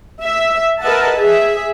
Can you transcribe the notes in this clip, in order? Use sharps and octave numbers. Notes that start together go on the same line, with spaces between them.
E5
A#4 B4 D#5 E5 F#5 A5
G#4 E5